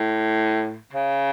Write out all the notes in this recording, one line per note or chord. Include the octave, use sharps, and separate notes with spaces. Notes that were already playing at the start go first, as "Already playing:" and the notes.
Already playing: A2
C#3